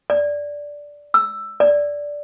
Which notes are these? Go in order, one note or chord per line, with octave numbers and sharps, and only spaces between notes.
D5
E6
D5